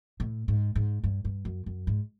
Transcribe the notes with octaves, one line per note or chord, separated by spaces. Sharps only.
A2
G#2
G#2
G2
G2
F#2
F#2
G#2